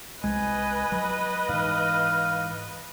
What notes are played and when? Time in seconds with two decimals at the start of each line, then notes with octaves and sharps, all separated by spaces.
0.24 C2 G#3 B4 D#5 G#5
0.92 F#3
1.49 G#2 E3 F5